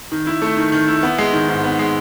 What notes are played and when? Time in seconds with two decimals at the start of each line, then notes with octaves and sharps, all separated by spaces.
0.12 D#3
0.27 E4
0.42 A3
0.57 D#3
0.72 D#3
0.88 E4
1.03 B3
1.18 G#3
1.33 D#3
1.48 G#2
1.64 B3
1.79 G#3